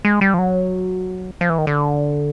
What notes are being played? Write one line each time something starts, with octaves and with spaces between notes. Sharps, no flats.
G#3
G3
F3
F#3
F3
E3
D#3
D3